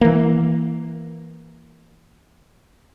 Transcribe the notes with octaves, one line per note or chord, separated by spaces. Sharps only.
E3 A#3